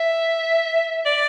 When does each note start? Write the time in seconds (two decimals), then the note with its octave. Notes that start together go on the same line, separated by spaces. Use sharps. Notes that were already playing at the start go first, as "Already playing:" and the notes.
Already playing: E5
1.05 D5